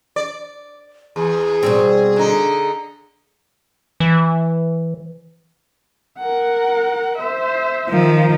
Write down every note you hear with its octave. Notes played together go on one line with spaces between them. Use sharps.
D5
E2 G#4
B2 G3 C4
D3 D#4
E3
A#4 F#5
C5 E5
D#3 F3